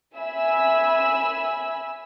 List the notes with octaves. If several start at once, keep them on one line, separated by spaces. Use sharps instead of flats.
E5 G#5 B5 E6